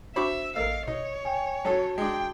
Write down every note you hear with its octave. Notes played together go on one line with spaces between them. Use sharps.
D4 F#4 C5 E5 B5 C#6 D6
A1 A#3 A4 A#4 D#5 F5 E6
B2 D#4 C#5
G5 G#5
F#3 C#4 F#4 A4 A5
G#3 D4 G5